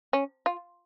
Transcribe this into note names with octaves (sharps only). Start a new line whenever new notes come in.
C#4
F4